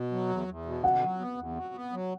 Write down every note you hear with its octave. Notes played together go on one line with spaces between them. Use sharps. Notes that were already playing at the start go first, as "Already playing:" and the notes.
Already playing: B2
F#3
E2
E2
B2
D3 F#5
F#3
B3
E2
F#3
B3
F#3